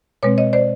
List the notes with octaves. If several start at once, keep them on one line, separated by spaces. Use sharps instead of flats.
B2 G#3 C4 B4 C#5
C#5 D#5
C5 D5